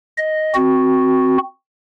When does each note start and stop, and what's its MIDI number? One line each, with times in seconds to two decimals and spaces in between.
0.18 0.54 75
0.55 1.38 60
0.55 1.38 66